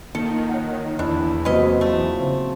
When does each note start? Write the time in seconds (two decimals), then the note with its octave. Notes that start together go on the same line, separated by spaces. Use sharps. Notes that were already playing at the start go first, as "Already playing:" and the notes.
0.15 D#3 A#3 F4 A4
0.49 C#5 F#5
0.99 E2 D4 E4
1.45 C3 F#3 A#3 C4 C#4 F#4 B4 D#5
1.81 F3 A3 E4
2.15 C#3 C4